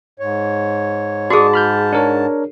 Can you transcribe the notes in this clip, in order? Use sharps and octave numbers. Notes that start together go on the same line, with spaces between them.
G#2 C#5
G#2 F#4 G#4 D5 A5 C#6 D#6
B5 F6 G6
D4 A#4 C#5